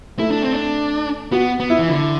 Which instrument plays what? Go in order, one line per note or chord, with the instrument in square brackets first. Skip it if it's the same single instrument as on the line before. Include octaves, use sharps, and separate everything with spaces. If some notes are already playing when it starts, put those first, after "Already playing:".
[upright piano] A3 [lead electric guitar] E4
[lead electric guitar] D4
C4
D4
[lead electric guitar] B3 [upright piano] F#4
[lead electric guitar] B3
[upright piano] E4
[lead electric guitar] E3
[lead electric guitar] D3 [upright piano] E4